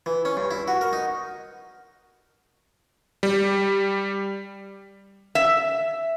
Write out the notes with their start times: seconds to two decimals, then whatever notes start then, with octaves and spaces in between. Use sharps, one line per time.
0.06 E3
0.25 C#4
0.37 G2
0.51 E4
0.68 F#4
0.81 A#4
0.93 D#4
3.23 G3
5.35 E5